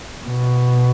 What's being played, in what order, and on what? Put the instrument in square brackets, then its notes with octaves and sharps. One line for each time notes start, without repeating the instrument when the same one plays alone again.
[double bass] B2